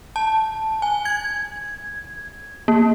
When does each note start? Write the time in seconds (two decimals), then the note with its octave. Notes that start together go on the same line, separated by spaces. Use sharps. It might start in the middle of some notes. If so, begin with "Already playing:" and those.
0.16 A5
0.82 G#5
1.05 G#6
2.68 A#3